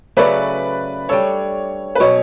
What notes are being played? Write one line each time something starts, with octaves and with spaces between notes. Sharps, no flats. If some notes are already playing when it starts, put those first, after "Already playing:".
C#3 F#3 A3 C#4 B4 D5
G3 D4 A4 C#5
B4
B2 F#3 C#4 C#5